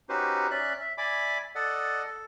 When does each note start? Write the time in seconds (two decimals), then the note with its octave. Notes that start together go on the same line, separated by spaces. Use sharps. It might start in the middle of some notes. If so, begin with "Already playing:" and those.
0.09 C#4 D#4 F#4 G4 B4 C5
0.51 C#4 D5 E5 F#6
0.81 E5
0.98 D5 E5 G#5 B5 D6
1.55 A4 D5 D#5 F#5
2.06 A4